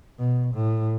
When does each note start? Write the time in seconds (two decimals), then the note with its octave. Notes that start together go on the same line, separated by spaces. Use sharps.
0.19 B2
0.55 A2